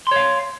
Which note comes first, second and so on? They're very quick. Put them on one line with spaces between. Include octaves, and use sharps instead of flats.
C6 C#5 F5